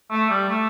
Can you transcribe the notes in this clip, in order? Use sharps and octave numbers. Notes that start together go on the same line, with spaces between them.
A3
G3
A3